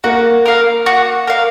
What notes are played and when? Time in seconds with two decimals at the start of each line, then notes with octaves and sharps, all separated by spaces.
0.04 A#3 F#4
0.45 A#4 F5
0.86 F#4
1.27 A#4 F5